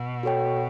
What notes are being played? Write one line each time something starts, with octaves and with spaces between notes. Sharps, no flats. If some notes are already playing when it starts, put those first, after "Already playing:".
Already playing: B2
F#4 A4 C#5 G5